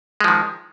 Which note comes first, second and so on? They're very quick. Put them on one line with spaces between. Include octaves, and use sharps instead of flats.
G#3 F3 D#3